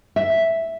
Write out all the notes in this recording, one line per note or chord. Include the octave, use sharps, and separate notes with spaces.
E5